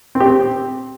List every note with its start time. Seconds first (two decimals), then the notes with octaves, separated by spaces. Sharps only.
0.15 C4
0.20 G4
0.26 C4